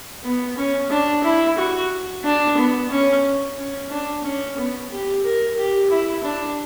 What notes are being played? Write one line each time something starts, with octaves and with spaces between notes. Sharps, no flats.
B3
C#4
D4
E4
F#4
D4
B3
C#4
C#4
D4
C#4
B3
G4
A#4
G4
E4
D4